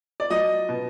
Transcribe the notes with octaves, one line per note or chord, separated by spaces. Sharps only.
D5
F#3 D#5
B2